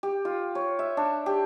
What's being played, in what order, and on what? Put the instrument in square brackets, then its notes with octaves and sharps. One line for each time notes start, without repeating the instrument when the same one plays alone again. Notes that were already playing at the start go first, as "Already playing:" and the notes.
[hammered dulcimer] G4
F4
C#5
E5
D4
G4